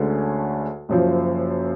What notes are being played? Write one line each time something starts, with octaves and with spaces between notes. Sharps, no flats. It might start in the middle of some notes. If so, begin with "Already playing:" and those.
Already playing: D2 D3 G#3 C#4
F#1 F#2 F3